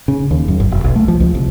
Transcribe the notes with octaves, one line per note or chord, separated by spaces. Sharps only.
C#3
D#2
F#2
G1
E1
B1
A3
F3
C#2
C2